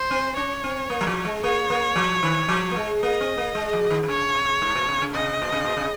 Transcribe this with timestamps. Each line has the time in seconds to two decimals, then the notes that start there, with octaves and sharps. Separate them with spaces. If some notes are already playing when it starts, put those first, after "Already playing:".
Already playing: C5
0.11 C4
0.36 C#4 C#5
0.64 C4
0.90 A#3
1.01 F#3
1.07 F3
1.25 G#3
1.43 A#3 C#5
1.70 A#3
1.96 F3
2.23 D#3
2.48 F3
2.71 A#3
2.76 G#3
3.02 A#3 D#5
3.20 C4
3.38 A#3
3.55 G#3
3.73 F3
3.90 D#3
4.03 D#3
4.08 C#3 C#5
4.35 C3
4.62 G#2
4.75 A#2
4.88 C3
5.02 C#3
5.14 C3 D#5
5.42 A#2
5.52 C3
5.64 A#2
5.77 C3